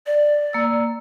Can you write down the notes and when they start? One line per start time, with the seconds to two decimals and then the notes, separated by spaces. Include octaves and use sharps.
0.06 D5
0.53 A#3 E6